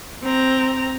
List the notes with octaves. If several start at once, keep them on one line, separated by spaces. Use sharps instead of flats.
C4 A#5